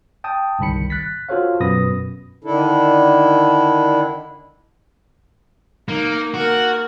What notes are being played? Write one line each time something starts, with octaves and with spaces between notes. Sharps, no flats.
G5 A5 D#6
G1 C2 D#3 B5 C#7
F#6 A6 B6
F4 F#4 A4 C5 C#5 F5
F#2 B2 B4 B5 D#6 A#6
D3 D#3 D4 E4 A4
A#3 D#4
A#3 F#4 A#4